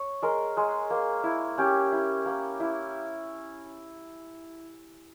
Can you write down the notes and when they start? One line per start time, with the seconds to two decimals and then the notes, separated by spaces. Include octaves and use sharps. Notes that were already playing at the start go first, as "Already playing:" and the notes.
Already playing: C#5
0.22 G#3 A#4
0.57 G#3
0.90 A#3
1.23 E4
1.58 C#4 G4
1.92 E4
2.26 A#3
2.60 E4